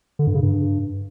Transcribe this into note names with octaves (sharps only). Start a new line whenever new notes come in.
D3
G2
C#3
G2